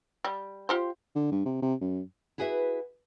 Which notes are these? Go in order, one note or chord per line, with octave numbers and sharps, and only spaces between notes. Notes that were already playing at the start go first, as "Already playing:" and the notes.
G3
F4 G4 C5
D3
G2
C3
C3
F#2
E4 F#4 G#4 B4 D5 E5